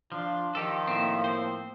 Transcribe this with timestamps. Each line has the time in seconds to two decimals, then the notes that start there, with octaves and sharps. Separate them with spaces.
0.12 F3 D4 F4
0.55 D#3 F3 D#4 G4 A4
0.87 A2 A#3 C4 E5
1.24 C4 C5